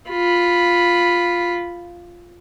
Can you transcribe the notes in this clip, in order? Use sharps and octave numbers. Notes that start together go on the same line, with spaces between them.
F4 B5